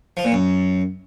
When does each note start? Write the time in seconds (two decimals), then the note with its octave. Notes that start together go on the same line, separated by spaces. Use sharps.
0.17 F3
0.24 A#2
0.32 F#2